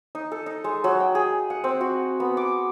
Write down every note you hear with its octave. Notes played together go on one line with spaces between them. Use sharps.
D#4
A4
D#4
G#3
F#3
G5
G#4
F#5
C4
F#4
B3
D6